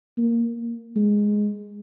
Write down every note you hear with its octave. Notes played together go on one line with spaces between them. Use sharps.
A#3
G#3